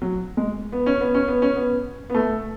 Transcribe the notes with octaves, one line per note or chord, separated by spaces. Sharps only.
F#3
G#3
B3
C#4
B3
C#4
B3
C#4
B3
B3
A3